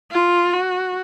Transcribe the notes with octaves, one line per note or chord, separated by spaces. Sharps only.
F4
F#4